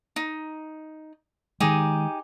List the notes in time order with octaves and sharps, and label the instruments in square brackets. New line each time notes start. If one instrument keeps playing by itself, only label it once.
[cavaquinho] D#4
[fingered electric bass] D#3 G#3 [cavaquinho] D#4 G4 G#4